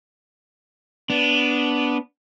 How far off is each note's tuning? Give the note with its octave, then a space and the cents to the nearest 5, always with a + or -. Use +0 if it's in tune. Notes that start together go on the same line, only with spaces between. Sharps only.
B3 -5 D4 -15